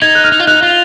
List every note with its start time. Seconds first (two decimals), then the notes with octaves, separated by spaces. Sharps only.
0.02 D#4 G#6
0.15 F#6
0.24 F6
0.32 D#4
0.40 F4
0.47 D#4 F#6
0.62 F4